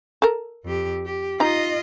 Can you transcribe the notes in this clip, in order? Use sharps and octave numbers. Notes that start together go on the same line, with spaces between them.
A4 A#4
F2 G4
G4
D#4 F4 D#5 A#5